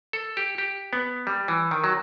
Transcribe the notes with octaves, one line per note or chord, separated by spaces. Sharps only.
A4
G4
G4
B3
G3
E3
D#3
F#3